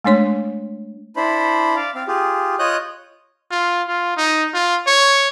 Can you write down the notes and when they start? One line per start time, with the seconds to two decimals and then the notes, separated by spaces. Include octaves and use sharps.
0.04 G#3 A3 D4 C#5 C6
1.16 D4 E4 C5 B5
1.76 D5 F5
1.95 C4 F5
2.08 F4 G4 G#4
2.59 F4 C#5 D#5 D#6 F#6 G6
3.51 F4
3.88 F4
4.17 D#4
4.54 F4
4.87 C#5